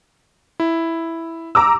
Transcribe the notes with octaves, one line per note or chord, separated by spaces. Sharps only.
E4
A#5 D6 E6